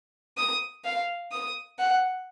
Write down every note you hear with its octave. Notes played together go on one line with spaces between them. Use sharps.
D#6
F5
D#6
F#5